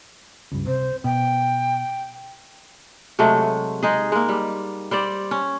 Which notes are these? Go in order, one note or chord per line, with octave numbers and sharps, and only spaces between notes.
C#2 G2
C3 C5
B2 G5
C3 F#3 G#3 A3
G#3 D#4 G#4
G#3 A#3
G3
G3 C5 D5
C#4